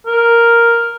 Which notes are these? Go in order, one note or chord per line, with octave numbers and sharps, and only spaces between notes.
A#4